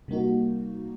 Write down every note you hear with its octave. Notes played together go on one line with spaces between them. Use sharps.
C3 G3 A#3 D#4 F#4